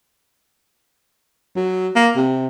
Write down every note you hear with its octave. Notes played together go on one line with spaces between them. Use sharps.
F#3
A#3
C3